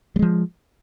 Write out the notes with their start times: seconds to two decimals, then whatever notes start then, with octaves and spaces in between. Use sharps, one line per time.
0.16 G3
0.19 G#3
0.22 F3